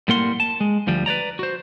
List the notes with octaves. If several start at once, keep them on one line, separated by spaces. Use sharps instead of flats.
A2 G3 A#3 A#4 F#5 C6
A5
G#3
D2 F3 G3
B4 C#5 D5 A#5
F#4 C5